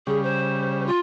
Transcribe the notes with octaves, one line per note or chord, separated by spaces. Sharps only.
C#3 G3 G#4
C5
F4